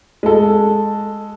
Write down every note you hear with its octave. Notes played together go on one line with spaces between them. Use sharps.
G#3 A4